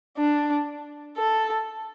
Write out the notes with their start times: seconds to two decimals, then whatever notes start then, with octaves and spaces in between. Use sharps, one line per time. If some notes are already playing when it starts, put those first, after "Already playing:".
0.17 D4
1.18 A4